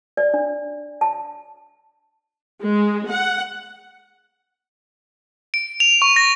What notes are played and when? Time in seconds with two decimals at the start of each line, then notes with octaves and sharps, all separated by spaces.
0.17 D5
0.34 D4
1.01 A5
2.63 G#3
3.09 F#5
5.54 D7
5.80 F7
6.02 C#6
6.16 A#6